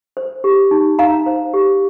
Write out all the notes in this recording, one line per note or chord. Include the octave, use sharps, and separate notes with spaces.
C5
G4
D#4
D#4 F5 A#5
C5
G4